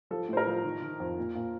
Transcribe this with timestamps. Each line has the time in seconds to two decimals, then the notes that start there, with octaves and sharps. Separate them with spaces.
0.11 F3 A4
0.29 A2 C5
0.37 A#4
0.47 F3
0.64 D#3
0.82 D#3
1.00 F2
1.18 A#2
1.35 A#2